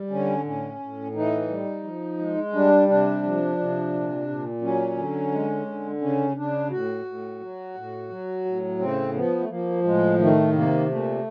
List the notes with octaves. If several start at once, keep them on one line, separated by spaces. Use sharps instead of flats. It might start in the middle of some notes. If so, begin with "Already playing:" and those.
Already playing: G3
D3 C#4
A2 C#4
A2
E3 D#4
G3
F3
G#3
G3 D4
C3 D4
F3
C3
A#2
A#2
F#3 C#4
D3
G#3
D3
C#3 C#4
C#3 D4
A2 F#4
A2
F#3
A2
F#3
A2
C#3 C4
F3 B3
A3
F3 A#3
A2 G#3
D#3 A3
C3 A#3
A#2 A3